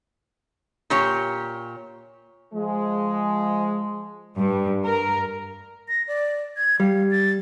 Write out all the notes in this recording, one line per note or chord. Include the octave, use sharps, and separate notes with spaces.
A#2 G4 C#5
F3 G#3
G2
A#4
A#6
D5
G#6
G3 F5
A6